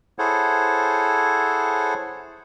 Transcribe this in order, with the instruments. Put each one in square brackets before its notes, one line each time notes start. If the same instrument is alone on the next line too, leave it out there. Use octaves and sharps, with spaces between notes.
[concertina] E4 G#4 A4 C5 C#5 F#5